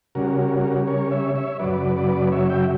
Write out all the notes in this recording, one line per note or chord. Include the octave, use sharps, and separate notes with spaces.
C#3 G3 C#4 F#4 A#4
A#4 C#5
C#5 E5
C#5 E5
F#2 C#3 F#3 B4 D5
B4 D5
C#5 E5
E5 G5